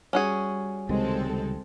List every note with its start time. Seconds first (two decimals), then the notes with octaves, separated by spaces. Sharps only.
0.13 G3 C#4 F#4 G#4
0.89 C#2 C3 D#3 G#3 C4 A4